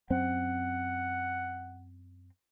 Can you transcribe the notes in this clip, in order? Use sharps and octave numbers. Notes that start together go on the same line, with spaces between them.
F#2 C4 F#5